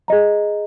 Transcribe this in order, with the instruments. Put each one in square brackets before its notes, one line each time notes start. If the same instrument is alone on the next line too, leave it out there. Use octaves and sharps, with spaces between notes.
[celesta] G#4 D#5 A#5